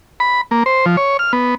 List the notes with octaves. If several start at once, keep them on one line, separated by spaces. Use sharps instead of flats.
B5
A#3
C5
F3
C#5
F6
B3